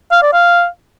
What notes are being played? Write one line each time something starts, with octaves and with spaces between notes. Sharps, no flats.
F5
D5
F5